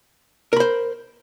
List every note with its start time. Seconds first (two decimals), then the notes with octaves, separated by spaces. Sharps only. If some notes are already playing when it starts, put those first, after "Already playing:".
0.53 A#4
0.56 B5
0.60 C5